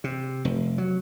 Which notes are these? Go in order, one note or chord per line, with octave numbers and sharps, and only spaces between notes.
C3
F1
F#3